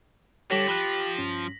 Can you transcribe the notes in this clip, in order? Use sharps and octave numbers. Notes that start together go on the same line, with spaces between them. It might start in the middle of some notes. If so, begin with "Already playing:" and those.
D3 G3 G4 A4 C#5 A#6 B6 F#7
F3 B5 F#6
G2 C#4